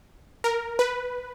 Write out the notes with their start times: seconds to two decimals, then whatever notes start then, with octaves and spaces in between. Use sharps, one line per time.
0.44 A#4
0.79 B4